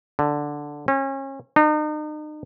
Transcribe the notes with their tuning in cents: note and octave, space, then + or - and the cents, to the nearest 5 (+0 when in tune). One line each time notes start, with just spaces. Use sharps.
D3 +0
C#4 -35
D#4 -40